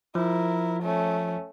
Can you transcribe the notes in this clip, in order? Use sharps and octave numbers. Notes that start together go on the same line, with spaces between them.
F3 E4 A#4
A3 C#4